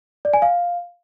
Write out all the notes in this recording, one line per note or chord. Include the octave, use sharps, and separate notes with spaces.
D5
G#5
F5